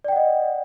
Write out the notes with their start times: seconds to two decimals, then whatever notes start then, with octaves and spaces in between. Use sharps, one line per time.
0.04 D5
0.08 G5
0.12 F#5
0.16 D#5